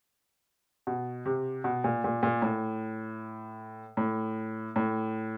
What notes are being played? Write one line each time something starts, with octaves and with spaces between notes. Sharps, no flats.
B2
C3
B2
A#2
A#2
A#2
A2
A2
A2